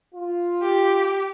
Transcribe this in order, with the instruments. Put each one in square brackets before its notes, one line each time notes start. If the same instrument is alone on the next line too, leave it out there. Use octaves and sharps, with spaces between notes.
[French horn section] F4
[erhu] G4